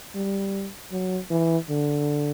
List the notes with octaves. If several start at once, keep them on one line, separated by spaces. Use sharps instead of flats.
G3
F#3
E3
D3